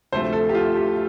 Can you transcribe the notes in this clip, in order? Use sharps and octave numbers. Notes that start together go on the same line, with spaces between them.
D2 C3 F3 A3 C5
A4
G4
F4
G4